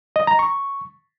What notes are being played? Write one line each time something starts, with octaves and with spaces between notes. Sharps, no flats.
D#5
A#5
C#6